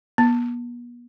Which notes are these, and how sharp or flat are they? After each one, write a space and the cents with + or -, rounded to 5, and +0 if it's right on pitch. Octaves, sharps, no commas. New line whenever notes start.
B3 -40